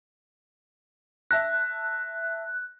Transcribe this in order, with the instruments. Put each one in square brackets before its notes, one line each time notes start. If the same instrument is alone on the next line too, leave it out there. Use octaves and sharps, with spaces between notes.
[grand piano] E5 A5 A#6 [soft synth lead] F#6